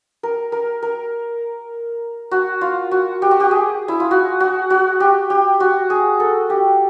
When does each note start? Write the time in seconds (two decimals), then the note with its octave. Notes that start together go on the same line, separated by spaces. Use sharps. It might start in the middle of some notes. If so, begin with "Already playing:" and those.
0.23 A#4
0.52 A#4
0.82 A#4
2.31 F#4
2.61 F4
2.91 F#4
3.22 G4
3.31 F#4
3.40 G4
3.51 G#4
3.88 E4
4.00 F4
4.11 F#4
4.40 F#4
4.70 F#4
5.00 G4
5.30 G4
5.60 F#4
5.90 G#4
6.20 A4
6.50 G4